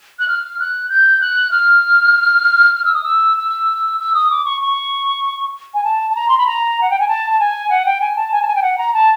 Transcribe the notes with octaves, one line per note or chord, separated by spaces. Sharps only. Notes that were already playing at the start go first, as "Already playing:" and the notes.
F#6
F6
F#6
G6
F#6
F6
F6
E6
D#6
E6
E6
E6
D#6
D6
C#6
C#6
G#5
A5
A5
A#5
C6
B5
A#5
F#5
G5
G#5
A5
A5
G#5
F#5
G5
G#5
A5
G#5
A5
G#5
G5
F#5
A#5
A5